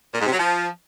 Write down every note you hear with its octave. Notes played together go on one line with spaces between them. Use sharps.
A#2
G#2
C3
F#3
F3